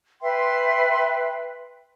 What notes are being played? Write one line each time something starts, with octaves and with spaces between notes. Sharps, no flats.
B4 E5 G5 C6